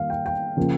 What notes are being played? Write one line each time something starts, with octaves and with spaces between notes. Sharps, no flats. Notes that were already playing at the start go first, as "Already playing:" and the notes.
Already playing: D#3 G3 A#3 F5
G5
G5
C#3 F3 A#3